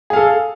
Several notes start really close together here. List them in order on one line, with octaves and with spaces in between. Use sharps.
G#4 F5 A4